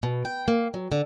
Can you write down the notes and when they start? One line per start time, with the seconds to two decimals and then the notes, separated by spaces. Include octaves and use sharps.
0.03 B2
0.25 G5
0.48 A#3
0.74 F#3
0.92 D3